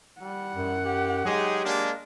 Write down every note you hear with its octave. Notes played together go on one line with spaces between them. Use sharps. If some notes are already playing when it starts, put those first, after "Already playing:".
G3 F#5
F#2
G4
F#3 G#3 D#4 G4 G#4
G#3 A#3 D4